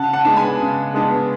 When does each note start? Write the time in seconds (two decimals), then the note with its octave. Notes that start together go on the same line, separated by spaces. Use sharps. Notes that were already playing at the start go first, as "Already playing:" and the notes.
Already playing: C#3 F#5 A5
0.13 F#5 A5
0.25 G#3 B3 D4
0.36 G#5 B5
0.60 C#3
0.94 G#3 B3 D4